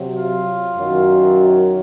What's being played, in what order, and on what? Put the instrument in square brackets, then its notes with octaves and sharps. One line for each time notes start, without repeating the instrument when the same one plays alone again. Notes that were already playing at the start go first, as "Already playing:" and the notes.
Already playing: [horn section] C3 F#3
F4
F#2 D#3 F#3